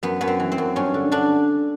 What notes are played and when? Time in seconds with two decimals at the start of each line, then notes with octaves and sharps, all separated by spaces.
0.03 F#2 B3
0.21 F#2 B3
0.27 C4
0.40 E3
0.52 C4
0.58 F#2
0.76 G2 C#4
0.94 D3
1.12 D3 D4